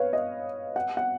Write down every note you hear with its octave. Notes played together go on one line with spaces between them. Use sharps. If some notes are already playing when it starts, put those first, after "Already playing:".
Already playing: B4 C#5 F5
D#5
F#5
F#5